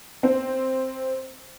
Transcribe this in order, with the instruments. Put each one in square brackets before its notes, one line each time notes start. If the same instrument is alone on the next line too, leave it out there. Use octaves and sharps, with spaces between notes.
[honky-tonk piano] C4